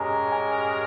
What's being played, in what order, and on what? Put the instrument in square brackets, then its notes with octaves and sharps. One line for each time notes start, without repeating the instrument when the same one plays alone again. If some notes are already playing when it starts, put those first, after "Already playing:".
Already playing: [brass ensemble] G#3 C#4 G4 A#4 [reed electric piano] A#5
[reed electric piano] G#5